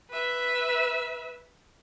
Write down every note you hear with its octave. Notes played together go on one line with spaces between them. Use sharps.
B4 E5